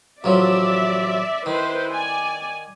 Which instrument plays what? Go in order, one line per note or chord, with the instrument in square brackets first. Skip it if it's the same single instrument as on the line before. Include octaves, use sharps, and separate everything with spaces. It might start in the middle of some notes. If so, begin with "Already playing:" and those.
[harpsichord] A1 F3 F#3 [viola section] D5 E5
[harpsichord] D#3 [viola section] E4 B4 C5
[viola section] D5 G#5